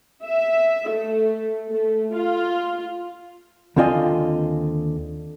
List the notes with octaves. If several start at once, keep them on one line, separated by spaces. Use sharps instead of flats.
E5
A3
A3
F4
D#2 D3 C4 F4 D#5 G#5